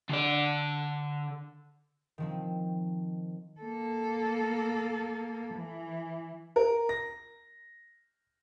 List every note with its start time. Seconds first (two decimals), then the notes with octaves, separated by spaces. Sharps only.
0.09 D3 D5
2.18 D#3 F3 C4
3.61 A#3 A4
5.55 E3
6.56 A#4
6.89 A#6